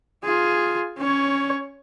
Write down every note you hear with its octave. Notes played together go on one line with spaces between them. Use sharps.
F4 G#4
C#4 C#5